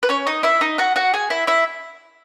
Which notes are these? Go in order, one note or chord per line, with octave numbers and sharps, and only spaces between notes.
B4
C#4 C#5
D#4 D#5
E4 E5
D#4 D#5
F#4 F#5
F#4 F#5
G#4 G#5
E4 E5
E4 E5